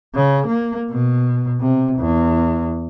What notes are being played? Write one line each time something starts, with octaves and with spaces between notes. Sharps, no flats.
C#3
A#3
B2
C3
E2